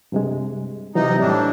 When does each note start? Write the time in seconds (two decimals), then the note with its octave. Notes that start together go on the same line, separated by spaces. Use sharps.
0.12 G2 C3 G#3
0.95 C3 E3 F#3 D#4
1.20 A2 E3 G3 D4